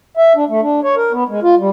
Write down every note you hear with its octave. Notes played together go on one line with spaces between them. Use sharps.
E5
D4
A3
D4
C#5
A#4
B3
G#3
F4
G3